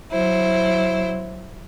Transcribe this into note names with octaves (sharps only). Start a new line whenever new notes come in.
F#3 E4 C5